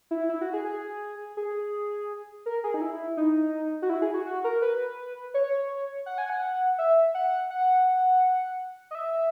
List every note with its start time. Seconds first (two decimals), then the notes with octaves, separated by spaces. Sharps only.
0.11 E4
0.29 E4
0.41 F#4
0.53 G#4
0.65 G#4
1.37 G#4
2.46 A#4
2.64 G#4
2.74 D#4
2.81 E4
3.17 D#4
3.82 F#4
3.90 E4
4.02 G#4
4.14 F#4
4.26 F#4
4.44 A#4
4.62 B4
5.34 C#5
6.06 F#5
6.18 G#5
6.30 F#5
6.78 E5
7.14 F#5
7.51 F#5
8.91 D#5
8.95 E5